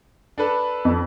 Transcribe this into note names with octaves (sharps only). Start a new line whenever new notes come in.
D4 A4 B4
F2